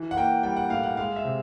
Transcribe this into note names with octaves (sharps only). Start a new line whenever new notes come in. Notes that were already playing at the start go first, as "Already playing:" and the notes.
Already playing: E3
F#5
A#3 G5
G3 G5
F#5
A2 F5
F#5
G#3 F5
E5
C3